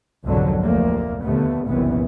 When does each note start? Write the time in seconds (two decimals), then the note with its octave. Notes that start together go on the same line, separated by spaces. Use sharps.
0.24 C2 F2 G#2 B2 D3 F#3
0.61 F1 D2 A3 A#3
1.22 D#2 B2 D3 A3 B3
1.67 F#1 C2 F#2 A#2 E3 B3